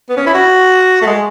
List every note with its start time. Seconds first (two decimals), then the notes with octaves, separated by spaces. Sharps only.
0.10 B3
0.17 C#4
0.26 E4
0.34 F#4
1.02 A3
1.07 G#3